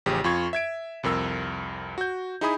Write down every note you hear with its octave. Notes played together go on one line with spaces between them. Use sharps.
A1 C#3 F3 G4 G#4
F2 F4 C#6 G#6
E5 G#6 D7
C2 F2 A#4 E6
F#4 G6
D#4 E4 G#4 G#5 B5 D#6